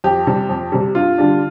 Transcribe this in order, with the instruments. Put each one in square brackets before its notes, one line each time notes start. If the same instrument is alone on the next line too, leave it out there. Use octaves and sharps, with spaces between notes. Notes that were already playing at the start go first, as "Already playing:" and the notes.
[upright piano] F2 G4
C3 G3
F2
C3 G3
G2 F4
D3 G3 D4